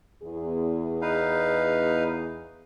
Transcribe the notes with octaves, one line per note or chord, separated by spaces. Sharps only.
E2 G#4
D#4 B4 F5